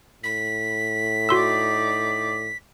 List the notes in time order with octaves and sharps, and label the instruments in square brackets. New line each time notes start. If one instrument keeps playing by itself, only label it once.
[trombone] A2 [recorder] B6
[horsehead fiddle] D#4 D5 [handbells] F#4 C6 E6